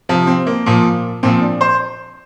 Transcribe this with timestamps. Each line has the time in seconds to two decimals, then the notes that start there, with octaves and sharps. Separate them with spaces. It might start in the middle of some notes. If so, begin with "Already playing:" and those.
0.09 C3 F3
0.27 C4
0.47 A#3
0.66 A#2 F3
1.23 A#2 F3 C4
1.41 D4
1.61 C5